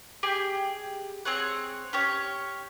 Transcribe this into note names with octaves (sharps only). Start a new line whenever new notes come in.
G4 G#4 G5
C4 G#4 C#5 F#5
C#4 G4 C#5